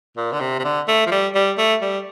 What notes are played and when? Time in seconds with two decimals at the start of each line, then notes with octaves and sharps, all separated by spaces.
0.17 A#2
0.32 D3
0.40 C3
0.59 C3
0.64 D3
0.88 A3
1.06 F3
1.11 G3
1.35 G3
1.58 A3
1.81 G3